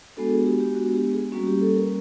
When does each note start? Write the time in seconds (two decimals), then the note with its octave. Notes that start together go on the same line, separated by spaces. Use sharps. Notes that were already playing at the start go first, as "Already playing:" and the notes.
0.17 G#3 B3 D4 F#4 A4
0.31 G#4
0.45 G4
0.60 G4
0.75 F#4
0.94 G4
1.13 G#4
1.32 G3 A#3 C#4 F#4
1.47 G4
1.61 A4
1.76 A#4